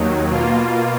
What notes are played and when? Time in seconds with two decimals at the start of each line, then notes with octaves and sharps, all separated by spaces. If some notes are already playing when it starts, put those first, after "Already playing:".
Already playing: D#2 D#3 F#3
0.28 B2 A#3 F4